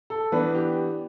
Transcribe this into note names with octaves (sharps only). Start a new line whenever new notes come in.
A4
E3 B3 D4 B4
G4